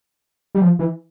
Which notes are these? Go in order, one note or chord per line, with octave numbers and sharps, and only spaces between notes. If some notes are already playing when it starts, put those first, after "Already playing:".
G3
F3
E3